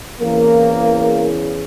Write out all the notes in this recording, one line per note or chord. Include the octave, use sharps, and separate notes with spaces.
E2 C#3 E3 A#3